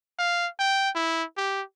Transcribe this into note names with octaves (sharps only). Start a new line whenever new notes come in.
F5
G5
E4
G4